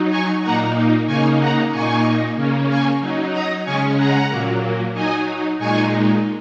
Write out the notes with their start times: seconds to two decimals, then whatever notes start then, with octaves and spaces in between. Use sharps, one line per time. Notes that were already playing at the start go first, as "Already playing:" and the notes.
Already playing: F#3 D#4
0.10 G#5 C#6
0.42 A#2 A#3 D#4 F#5 A#5
1.07 C#3 A#3 D#4 G#5 C#6
1.39 F#5 A#5
1.72 A#2 A#3 D#4 G#5 C#6
2.36 C#3 A#3 C#4
2.69 G#5 C#6
3.00 F#3 D#4
3.32 A#5 D#6
3.65 C#3 G#3 C#4 G#5 C#6
3.97 F#5 A#5
4.29 A#2 F#3 A#3
4.93 F#3 D#4 D#5 G#5
5.58 A#2 G#3 D#4 G#5 C#6